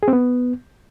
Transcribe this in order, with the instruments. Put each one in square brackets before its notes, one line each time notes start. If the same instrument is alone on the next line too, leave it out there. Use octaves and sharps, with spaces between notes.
[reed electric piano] G#4
C4
B3